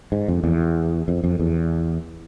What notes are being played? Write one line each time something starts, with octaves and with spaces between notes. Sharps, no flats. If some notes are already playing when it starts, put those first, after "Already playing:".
G#2
F2
E2
F2
F2
E2